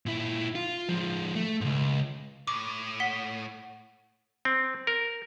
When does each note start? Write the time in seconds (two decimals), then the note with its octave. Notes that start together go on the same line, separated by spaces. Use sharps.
0.06 A#2 E4
0.55 F4
0.89 F3 G#3
1.35 A3
1.61 C#2 G#2
2.47 A2 D6
3.00 F#5 B6 G7
4.45 C4
4.87 A#4